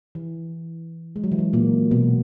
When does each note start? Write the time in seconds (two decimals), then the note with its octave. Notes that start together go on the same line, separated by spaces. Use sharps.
0.15 E3
1.16 G#3
1.24 F#3
1.32 E3
1.39 F#3
1.53 A#2 A#3
1.91 B2 B3